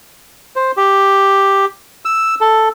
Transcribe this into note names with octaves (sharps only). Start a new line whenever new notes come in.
C5
G4
E6
A4